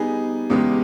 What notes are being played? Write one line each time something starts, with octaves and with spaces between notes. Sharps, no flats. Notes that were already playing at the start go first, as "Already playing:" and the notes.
Already playing: G3 B3 D#4 G#4
E2 C#3 G#3 B3 G4